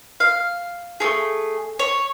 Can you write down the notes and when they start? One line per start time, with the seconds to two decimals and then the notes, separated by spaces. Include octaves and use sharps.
0.20 F5
1.00 A3 C#4 G#4
1.79 C#5